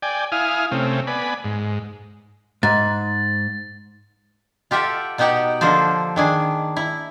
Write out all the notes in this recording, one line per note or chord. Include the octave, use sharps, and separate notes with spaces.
D5 G5 G#5
E4 F5 G#5 D#6 F6
C3 A3 C4 C#4
B3 D5 G#5 B5
G#2
G#2 A6
F4 G4 A4 E5 F#5
B2 B3 D#4 G4 F#5 G5
D3 F3 A#3 A4 C5
D#3 D4 G#4
E4